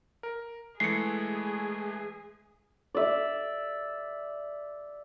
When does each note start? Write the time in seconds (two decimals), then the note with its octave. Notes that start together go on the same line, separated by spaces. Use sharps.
0.23 A#4
0.80 E3 G#3 A3 G#4 C7 C#7
2.95 D5 E5